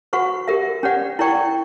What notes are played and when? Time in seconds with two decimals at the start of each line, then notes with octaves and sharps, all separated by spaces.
0.13 F#4 B4 F#5 C#6
0.48 G4 A#4 E5
0.83 C#4 G4 B4 D5 F#5
1.19 E4 A#4 D5 G5 C#6